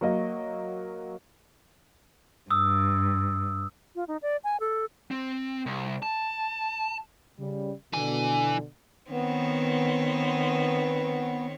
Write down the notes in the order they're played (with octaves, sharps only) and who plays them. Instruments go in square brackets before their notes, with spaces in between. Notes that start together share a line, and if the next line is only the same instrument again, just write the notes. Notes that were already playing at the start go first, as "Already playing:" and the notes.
[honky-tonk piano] F#3 A#3 D#5
[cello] G2 [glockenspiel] D#6 E6
[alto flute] F4
D#4
D5
G#5
A4
[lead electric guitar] C4
C2
A5
[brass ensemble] C#3 G3
[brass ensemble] B2 D3 [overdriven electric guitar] E3 G#5
[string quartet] D#3 C4 C#5 [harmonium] B3